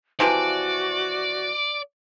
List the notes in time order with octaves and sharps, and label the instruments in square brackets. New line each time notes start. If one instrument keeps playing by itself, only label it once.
[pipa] C3 E3 F3 [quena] F#4 [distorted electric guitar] D5